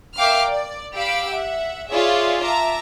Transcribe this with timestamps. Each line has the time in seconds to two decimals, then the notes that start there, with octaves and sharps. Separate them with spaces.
0.17 A#4 E5 F5 G5 D6 F6
0.48 D5
0.95 G4 F5 B5 E6 D7
1.32 E5 F#5
1.89 F4 G#4 C#5 D5 E5
2.43 E5 A5 A#5 D6